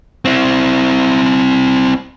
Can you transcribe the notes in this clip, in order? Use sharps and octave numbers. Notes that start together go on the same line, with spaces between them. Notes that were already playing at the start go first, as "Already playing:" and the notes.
C4 E4